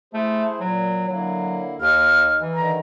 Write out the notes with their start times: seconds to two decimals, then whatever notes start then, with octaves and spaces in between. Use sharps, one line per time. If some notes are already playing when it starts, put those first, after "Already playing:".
0.14 A3 E4 G#4 C5
0.60 A#2 F#3
1.08 D3 F#3 A#3 E4
1.81 D#2 D#4 F6
2.41 E3
2.54 G2 D3 D#3 A#5